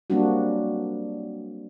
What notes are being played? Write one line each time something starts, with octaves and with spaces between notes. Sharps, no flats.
F#3 G3 A#3 C4 D4 F#4